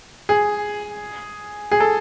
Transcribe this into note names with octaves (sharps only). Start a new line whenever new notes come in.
G#4
G#4
A4